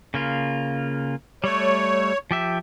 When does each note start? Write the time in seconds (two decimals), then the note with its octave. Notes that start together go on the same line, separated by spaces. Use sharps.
0.14 C#3 A#3 F4
1.44 G3 A3 C#5
2.31 F3 G4 E5